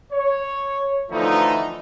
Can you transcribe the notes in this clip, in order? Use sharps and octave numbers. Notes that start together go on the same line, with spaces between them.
C#5
D3 E3 F3 A3 D#4